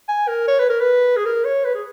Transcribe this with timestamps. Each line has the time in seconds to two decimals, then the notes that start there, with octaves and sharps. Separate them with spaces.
0.09 G#5
0.28 A#4
0.48 C#5
0.59 B4
0.69 A#4
0.81 B4
1.17 G#4
1.26 A#4
1.45 C#5
1.64 B4
1.75 G#4